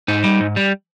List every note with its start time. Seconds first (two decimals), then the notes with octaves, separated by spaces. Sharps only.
0.08 G#2 D#4
0.24 G3
0.41 G#2
0.56 G3